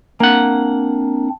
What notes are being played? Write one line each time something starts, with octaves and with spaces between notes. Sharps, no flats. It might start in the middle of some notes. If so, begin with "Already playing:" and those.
A#3 C4 D4 F#5